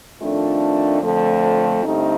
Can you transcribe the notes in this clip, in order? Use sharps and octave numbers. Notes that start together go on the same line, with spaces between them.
F2 D#3 A3 D4 F4
F2 D3 F3 A3
G2 D3 A3 C4 D#4